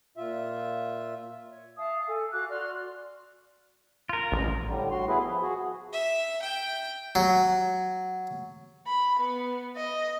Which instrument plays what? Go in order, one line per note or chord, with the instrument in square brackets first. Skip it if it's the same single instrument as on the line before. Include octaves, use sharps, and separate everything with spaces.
[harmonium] A#2 F4 E5
[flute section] C#5
E5 F5 A5 D#6
A4 G#5
F#4 F5 D6 F#6
F#4 D5 C6 F6
[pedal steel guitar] F4 A#4
[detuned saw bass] A1
[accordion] A2 D3 G3
A2 F#4 C6
B3 E4 G#4 B4
F3
F#4 G#4
[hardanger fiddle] E5
G5
[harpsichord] F#3
[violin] B5
B3
D#5